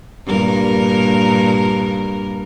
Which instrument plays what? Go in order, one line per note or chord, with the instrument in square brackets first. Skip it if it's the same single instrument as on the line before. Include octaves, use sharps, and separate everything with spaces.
[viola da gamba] G2 A#2 A#4